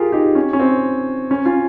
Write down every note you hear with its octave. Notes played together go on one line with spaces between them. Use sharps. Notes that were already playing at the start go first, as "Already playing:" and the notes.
Already playing: F4 G4 G#4 A#4
D#4 G4
C#4
C#4
C4
C#4
C#4 F4